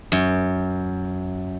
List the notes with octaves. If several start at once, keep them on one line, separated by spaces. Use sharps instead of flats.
F#2